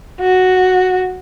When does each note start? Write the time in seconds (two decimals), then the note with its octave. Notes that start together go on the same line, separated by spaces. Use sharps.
0.21 F#4